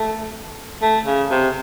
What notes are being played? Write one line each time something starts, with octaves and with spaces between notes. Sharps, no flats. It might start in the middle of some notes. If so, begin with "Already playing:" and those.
Already playing: A3
A3
C#3
C3